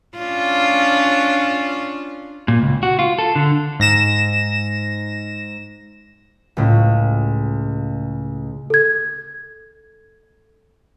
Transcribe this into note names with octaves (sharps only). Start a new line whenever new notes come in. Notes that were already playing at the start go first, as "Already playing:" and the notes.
C#4 D4 F4
A#2
C#2
F#4
F4
A4
D3
G#2 A#6 E7
C#2 A2
A4 G#6